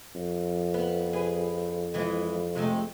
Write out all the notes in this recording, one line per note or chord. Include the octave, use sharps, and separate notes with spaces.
F2
B3
G#4 B4
E3 G#3 E4
C3 G#3 A3